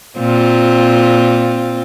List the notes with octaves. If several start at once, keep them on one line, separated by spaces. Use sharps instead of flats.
A#2 C4 F4